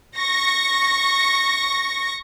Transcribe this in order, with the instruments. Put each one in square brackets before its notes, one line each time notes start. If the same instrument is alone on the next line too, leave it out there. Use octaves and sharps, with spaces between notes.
[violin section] C#6 A#6